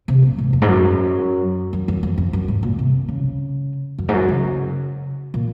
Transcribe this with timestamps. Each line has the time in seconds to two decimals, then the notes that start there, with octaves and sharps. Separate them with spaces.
0.08 C3
0.23 A#2
0.38 G#2
0.53 F2
0.62 G#2
0.68 F#2
1.73 F#2
1.88 F#2
2.03 F2
2.18 F2
2.33 F#2
2.48 G#2
2.63 A#2
2.79 C3
3.09 C#3
3.98 F#2
4.08 G#2
4.13 F#2
4.29 C#3
5.34 A#2